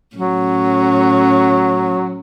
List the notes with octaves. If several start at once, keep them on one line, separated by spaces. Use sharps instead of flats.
A2 F#3 C#4